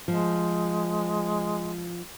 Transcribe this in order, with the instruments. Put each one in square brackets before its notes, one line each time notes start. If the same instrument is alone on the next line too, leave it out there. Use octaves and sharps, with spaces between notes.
[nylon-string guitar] F3 [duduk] G#3